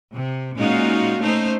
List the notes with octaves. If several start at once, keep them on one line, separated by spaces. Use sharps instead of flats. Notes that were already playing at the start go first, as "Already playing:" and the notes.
C3
A#2 G#3 C#4 D#4 F4 F#4
A3 C#4 D#4 C5